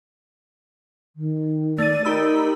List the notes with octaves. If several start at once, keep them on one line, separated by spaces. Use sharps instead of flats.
D#3
A3 D5 A6 D#7
D#4 G4 A#4 B5 E6